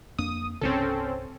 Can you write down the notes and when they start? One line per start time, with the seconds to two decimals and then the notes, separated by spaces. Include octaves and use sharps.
0.19 F2 A#3 D4 D#6
0.61 C2 G2 C#3 C4 C#4 A4